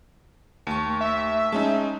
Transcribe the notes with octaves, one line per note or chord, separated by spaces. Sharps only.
D#2 A3 A5 C#6
E5
G#3 C#4 D#4 A5